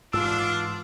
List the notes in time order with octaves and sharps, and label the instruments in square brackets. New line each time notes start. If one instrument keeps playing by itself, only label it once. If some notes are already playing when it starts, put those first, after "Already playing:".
[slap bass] G#2 E3 [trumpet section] D4 [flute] F4 [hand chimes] E6